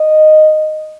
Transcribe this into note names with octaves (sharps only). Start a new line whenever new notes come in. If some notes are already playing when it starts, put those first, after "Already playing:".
Already playing: D#5